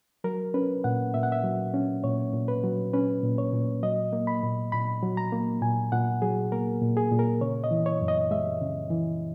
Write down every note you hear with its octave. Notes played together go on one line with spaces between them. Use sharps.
F#3 A#4
C#4 B4
A#2 F#5
A#2 E5
F#5
E5
F#3
C#4
A#2 C#5
A#2
B4
F#3
C#4 B4
A#2
C#5
A#2
F#3 D#5
A#3
B5
A#2
A#2 B5
F#3
A#5
A#3
A#2 G#5
A#2 F#5
F#3 G#4
A#3 A#4
A#2
G#4
A#2
A#4
C#3 C#5
D#5
E3
C#5
F#2
D#5
G#3 E5
C#3
E3